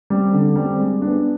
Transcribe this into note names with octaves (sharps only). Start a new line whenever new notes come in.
G3 C4
D3
G3 C4
G#3
B3 D4